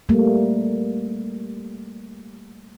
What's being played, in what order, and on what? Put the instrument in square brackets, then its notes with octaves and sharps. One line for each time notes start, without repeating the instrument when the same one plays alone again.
[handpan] G3 A3 A#3